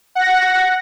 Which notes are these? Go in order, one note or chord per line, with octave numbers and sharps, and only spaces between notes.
F#5 A#6